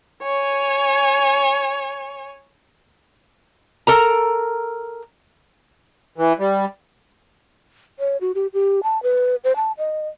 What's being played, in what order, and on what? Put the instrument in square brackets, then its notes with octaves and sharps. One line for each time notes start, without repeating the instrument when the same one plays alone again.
[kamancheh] C#5 G#5
[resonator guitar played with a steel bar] A4 A#4 A#5
[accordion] E3
G3
[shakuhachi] C#5
F#4
G4
G4
A5
B4
C5
A5
D#5